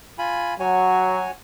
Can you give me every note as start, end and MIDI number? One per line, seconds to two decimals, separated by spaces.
0.18 0.54 65
0.18 0.54 80
0.18 0.54 83
0.60 1.24 54
0.60 1.31 66
0.60 1.31 73
0.60 1.31 80